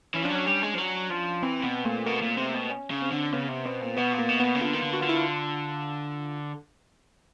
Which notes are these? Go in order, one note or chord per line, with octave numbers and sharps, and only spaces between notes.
E3 C#4
F3 D4
F#3 C#4
G3
G#3
F3
F#3
F3
E3 C4
C4
B2 B3
A#2 A3
B2 A#3
A#2
C3 C4
B2
C#4
C#3
C4
D3
C#3 B3
C3
B2 C4
A#2
B2 B3
A#2
A#3
B2
B2 B3
C#3
D3 F4
D#3
D3
F#4
D3 F4
E4
F4